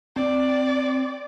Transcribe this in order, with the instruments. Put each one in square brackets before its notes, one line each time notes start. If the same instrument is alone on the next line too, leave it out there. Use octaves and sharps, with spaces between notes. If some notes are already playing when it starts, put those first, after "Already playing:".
[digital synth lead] C4 [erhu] D5